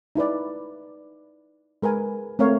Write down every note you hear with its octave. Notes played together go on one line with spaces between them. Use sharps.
D#4 E4 B4 D5
G#3 A#4 B4 G#5
A3 C4 A#4 C#5 F5